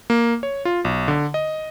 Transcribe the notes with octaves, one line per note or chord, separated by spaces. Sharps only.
A#3
C#5
F4
B1
D3
D#5